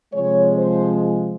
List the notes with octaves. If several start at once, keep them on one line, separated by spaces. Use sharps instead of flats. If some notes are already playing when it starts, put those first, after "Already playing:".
C3 F3 G#3 C#5
C5